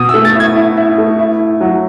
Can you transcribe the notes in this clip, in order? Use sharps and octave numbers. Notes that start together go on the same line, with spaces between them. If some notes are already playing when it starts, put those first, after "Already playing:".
Already playing: B2 D#6
A3 E6
A6
E4 G#6
E4
E4
A3
E4
E4
F#3